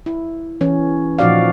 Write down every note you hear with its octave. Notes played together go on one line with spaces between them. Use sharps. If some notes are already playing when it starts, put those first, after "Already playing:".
E4
E3 C#4
A#2 F3 D#4 F#4 D5 F5